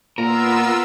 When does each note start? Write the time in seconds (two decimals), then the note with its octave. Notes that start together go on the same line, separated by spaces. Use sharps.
0.18 A#2 B3 F4 A#4 E6